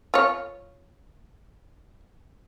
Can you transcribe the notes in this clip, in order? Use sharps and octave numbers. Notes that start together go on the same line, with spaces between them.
F4 C#5